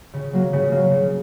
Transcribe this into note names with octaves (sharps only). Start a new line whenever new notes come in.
C#3
F#3 A#3
C#3
F#3 A#3
C#3